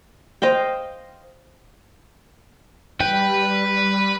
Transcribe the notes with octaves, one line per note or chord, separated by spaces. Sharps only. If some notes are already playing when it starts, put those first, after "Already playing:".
C5 D#5 F5 G5
G3 B4 G5